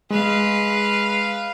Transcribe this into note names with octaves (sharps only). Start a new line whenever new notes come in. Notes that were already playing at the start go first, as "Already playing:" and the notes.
G#3 B4 F5